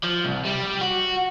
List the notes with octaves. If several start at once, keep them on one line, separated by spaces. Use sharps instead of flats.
F3
C2
G3
F#4